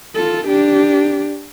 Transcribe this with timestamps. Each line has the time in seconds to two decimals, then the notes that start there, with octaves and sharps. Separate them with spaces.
0.16 F4 A4
0.47 D4 G4